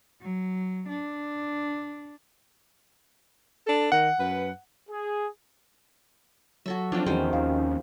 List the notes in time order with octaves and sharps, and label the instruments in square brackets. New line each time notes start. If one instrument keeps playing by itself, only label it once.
[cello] F#3
D4
[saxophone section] D4 A4
[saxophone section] D#3 [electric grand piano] F#5
[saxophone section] F#2 B4
[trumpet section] G#4
[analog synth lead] F#3 [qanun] F#4 A4 E5
[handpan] F3 [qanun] C4 F4 [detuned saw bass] D4
[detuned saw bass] E2 [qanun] D#3 C5 [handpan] C#4 F#4 G#4
[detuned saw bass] D#2 [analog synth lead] C#4 [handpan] F5